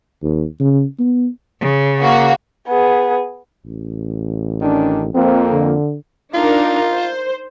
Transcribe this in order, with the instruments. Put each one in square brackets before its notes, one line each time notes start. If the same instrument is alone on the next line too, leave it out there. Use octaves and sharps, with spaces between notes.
[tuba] D#2
C#3
B3
[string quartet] C#3
[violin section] A#3 F#4
[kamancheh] B3 G#4
[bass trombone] A1
[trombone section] D#3 C#4 D4
[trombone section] F2 A#3 [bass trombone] C4
[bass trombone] D3
[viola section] D4 D#4 A#4 [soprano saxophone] F4
[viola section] C5